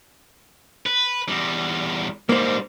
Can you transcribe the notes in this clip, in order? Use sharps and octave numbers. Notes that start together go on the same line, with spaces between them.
B4
E2 G3
G#2 G3 A#3 C5